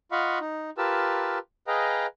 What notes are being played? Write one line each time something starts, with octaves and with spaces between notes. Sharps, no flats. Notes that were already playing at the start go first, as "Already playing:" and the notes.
F4 D#5 F5 F#5 B5 C#6
D#4
F4 G4 A#4 B4 A5 E6
G#4 B4 D#5 F5 G5 A#5